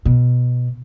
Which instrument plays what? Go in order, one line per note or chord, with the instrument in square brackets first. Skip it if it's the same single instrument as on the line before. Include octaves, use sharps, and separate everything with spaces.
[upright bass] B2